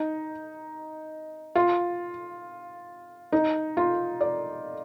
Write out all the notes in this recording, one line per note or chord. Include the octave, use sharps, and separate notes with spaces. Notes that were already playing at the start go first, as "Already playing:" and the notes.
Already playing: D#4
F4
D#4
F4
D5